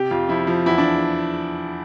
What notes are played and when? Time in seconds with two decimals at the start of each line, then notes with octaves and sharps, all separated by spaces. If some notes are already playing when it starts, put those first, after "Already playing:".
Already playing: C3 G4
0.11 F2 F4
0.29 F3 E4
0.47 F3
0.66 E2 E4
0.78 D4